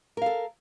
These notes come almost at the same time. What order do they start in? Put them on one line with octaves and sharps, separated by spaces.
A#4 F5 A4